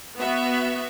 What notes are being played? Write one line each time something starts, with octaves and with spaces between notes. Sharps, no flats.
B3 F#4 E5